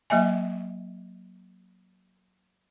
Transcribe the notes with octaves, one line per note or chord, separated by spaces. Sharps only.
F#3 A#3 D#5 E5 G#5